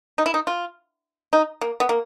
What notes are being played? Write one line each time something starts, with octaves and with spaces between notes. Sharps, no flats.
D#4
E4
D#4
F4
D#4
A#3
B3
A#3